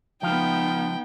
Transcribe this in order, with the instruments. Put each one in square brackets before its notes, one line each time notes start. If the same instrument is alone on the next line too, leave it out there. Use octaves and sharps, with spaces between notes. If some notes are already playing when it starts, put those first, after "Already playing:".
[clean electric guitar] C#2 F3 F5 [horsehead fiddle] B3 D#4 [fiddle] G5